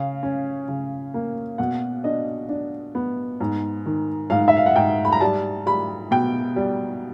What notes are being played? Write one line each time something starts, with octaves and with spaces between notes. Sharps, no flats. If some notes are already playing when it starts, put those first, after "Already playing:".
Already playing: C#3 F5
C#4
C#3
A#3
B2 F#5
D4 D#5
D4
B3
G#2
D#3
G#2 F5
E5
F5
F#5
G#2 G5
B5
A#5
G3 A5
G3 B5
B2 G5
G3